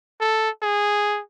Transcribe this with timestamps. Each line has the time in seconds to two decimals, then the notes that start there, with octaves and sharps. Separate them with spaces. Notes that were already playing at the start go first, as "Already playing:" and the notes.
0.21 A4
0.62 G#4